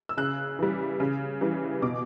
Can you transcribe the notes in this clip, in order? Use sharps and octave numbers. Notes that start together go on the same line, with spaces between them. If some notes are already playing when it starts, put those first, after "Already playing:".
E6
C#3 F#6
E3 G3
C#3
E3 G3
B2 D6